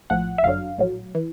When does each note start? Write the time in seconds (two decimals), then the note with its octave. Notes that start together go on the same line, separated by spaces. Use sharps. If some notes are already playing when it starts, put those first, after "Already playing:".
0.10 A#1 A2 F3 F#5
0.38 E5
0.43 G1 F#2 D3 F#3 F5
0.78 A#1 A2 F#3
1.15 E3